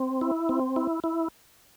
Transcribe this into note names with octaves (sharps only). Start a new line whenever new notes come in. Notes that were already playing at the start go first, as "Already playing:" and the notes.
Already playing: C4
E4
C4
E4
E4